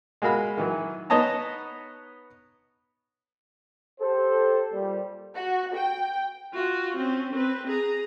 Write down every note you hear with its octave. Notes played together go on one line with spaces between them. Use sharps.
G#3 F#4 A#4 F5 B5
D#3 E3 F#3
B3 D#4 C#5 D#5 A5 A#5
G4 A4 C5
A#2 G3
F#4
G5
F4 F#4
C4 C#4
C4 B4
G#4 A#5